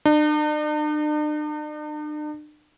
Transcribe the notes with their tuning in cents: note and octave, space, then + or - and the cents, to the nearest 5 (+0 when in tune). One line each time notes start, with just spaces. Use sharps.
D4 +45